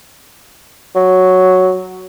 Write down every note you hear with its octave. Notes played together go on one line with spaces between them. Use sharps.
F#3